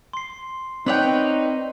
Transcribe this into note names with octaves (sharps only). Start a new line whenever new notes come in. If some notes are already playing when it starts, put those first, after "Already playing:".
C6 C7
C4 D#4 B4 C#5 D5 G5